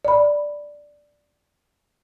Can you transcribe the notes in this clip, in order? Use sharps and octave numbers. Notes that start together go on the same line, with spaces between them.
D5 B5